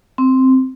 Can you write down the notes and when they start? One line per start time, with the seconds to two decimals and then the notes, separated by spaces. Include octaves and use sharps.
0.18 C4